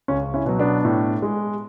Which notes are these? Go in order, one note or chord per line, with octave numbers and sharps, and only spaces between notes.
C#2 C#4
C#4 E4
B2 F#3
B3 D4
A2
G#3